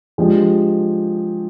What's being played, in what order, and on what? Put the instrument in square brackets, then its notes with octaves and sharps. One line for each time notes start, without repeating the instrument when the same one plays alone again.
[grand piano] F3 G#3 D4 G4